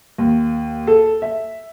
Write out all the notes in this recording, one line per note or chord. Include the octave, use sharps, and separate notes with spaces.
D#2
A4
E5